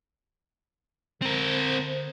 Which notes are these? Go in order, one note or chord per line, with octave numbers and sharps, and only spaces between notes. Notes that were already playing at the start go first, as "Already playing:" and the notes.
D3 C4 A#4 C5